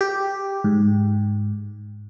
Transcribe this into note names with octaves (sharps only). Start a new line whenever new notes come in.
G4
G#2